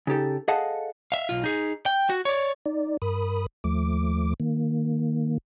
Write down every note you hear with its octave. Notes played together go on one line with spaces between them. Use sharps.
C#3 D#4 G4 A4
G#4 A4 D#5 F5 F#5 A5
E5 F5
B1 F4
D#4 G#4
G5
F#4
C#5 D5
D#4 D5
G2 A#4 B5 D#6
D#2 F3 A3 D6
D#3 A#3